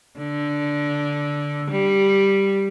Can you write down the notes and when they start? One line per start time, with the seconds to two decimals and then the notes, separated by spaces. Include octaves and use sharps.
0.17 D3
1.70 G3